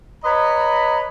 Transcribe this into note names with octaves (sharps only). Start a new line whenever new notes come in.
B4 C#5 D#5 A#5 B5